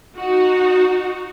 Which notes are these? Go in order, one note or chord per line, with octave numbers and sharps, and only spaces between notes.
D#4 F#4